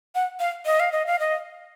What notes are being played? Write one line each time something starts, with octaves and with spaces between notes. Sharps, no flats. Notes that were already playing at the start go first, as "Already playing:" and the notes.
F#5
F5
D#5
F5
D#5
F5
D#5